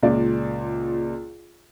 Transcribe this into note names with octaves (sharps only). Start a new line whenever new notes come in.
C#2 A#2 D5